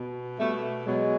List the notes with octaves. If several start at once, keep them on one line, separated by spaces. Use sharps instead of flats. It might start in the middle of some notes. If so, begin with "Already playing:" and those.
Already playing: B2
B2 G3 A3
B2 F#3 G#3